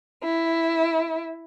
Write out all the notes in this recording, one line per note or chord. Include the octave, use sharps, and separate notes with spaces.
E4